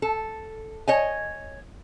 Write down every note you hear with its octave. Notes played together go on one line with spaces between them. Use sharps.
A4
C#5 D#5 G#5